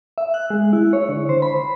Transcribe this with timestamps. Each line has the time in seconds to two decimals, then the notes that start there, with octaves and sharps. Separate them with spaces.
0.18 E5
0.34 F#6
0.50 G#3
0.73 E4
0.93 C#5
1.09 D3
1.29 C5
1.42 B5